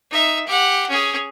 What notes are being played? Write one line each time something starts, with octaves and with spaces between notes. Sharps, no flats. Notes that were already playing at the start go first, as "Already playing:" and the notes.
D#4 E5
G4 F#5
C#4 G#4